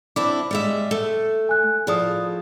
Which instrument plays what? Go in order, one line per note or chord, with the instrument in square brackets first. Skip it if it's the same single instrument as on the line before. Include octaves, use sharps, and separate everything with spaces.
[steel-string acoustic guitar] C4 D4 E4 [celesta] D6
[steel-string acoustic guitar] G3 G#3 E5
A3
[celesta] G#5 F#6
[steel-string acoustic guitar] A2 F3 [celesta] G#4 D5 D#6